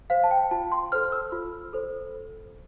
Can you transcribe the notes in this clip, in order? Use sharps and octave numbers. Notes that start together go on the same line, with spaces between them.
C5 F5
A5
G5
F4 A5
C6
A4 C5 F6
E6
F4
A4 C5